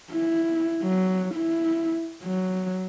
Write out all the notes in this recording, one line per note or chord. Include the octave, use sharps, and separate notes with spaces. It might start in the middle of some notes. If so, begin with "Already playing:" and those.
E4
F#3
E4
F#3